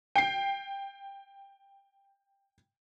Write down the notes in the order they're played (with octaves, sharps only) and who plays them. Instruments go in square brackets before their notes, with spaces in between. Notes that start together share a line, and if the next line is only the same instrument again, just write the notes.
[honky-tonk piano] G5 C7